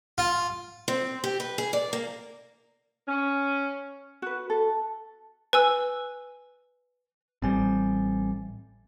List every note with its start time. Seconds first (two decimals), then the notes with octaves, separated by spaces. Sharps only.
0.18 F4
0.88 C4
1.24 G4
1.40 B4
1.58 G#4
1.73 D5
1.93 A#3
3.07 C#4
4.22 F#4 B4
4.50 A4
5.53 B4 G#5 E6
7.42 A1 G3 C4 G#5